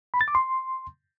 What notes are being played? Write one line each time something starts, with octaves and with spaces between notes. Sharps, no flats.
B5
A6
D6
C6